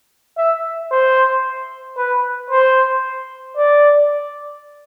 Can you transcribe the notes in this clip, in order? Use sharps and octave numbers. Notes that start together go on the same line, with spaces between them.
E5
C5
B4
C5
D5